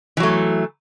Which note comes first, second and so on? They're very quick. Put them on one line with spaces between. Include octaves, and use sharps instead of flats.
E3 F#3 A3